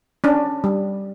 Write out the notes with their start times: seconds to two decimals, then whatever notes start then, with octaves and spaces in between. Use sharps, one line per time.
0.24 C#4 D4
0.64 G3